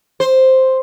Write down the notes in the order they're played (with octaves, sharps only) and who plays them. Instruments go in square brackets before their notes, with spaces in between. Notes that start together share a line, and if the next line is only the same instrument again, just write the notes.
[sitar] C5